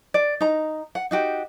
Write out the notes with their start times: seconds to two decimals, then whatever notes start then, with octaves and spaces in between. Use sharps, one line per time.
0.14 D5
0.40 D#4 A#5
0.95 F#5
1.11 D#4 F#4 G4